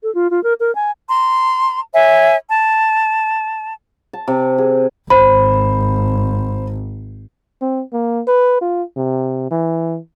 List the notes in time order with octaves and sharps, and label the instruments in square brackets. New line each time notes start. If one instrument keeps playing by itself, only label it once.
[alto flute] A4
F4
F4
A#4
A#4
G#5
[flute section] A#5 C6
C#5 E5 G#5
A5
[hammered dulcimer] A5
C3
G#4
[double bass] G#1 [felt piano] C5 [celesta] B5
[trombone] C4
A#3
B4
F4
C3
E3